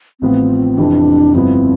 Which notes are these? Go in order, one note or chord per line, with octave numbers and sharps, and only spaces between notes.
A1 A2 F3 B3 C4 F4
F1 F2 C3 E3 D4
G1 G2 F3 B3 C4 E4